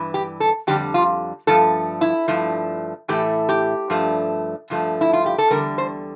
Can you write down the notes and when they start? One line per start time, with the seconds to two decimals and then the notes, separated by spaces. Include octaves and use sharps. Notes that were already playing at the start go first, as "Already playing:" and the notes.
Already playing: G2 E3
0.14 G4
0.40 A4
0.67 F2 D3 G3 G4
0.94 F4
1.47 G2 F3 A3 A4
2.01 E4
2.28 G2 F3 A3
3.08 A2 E3 A3 G4
3.49 G4
3.90 G2 F3 A3
4.70 G2 F3 A3
5.01 E4
5.13 F4
5.26 G4
5.38 A4
5.51 E2 D3 G3 A#4
5.78 C5